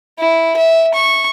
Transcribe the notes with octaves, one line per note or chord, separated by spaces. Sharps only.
E4
E5
C#6